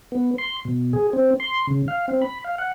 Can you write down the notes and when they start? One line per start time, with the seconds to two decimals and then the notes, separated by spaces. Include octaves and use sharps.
0.12 B3
0.38 C6
0.65 B2
0.93 G#4
1.13 C4
1.40 C6
1.67 C#3
1.88 F5
2.08 C4
2.22 B5
2.44 F5
2.58 F#5